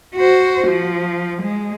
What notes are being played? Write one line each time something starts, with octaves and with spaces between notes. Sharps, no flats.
F#4 C5
F3
G#3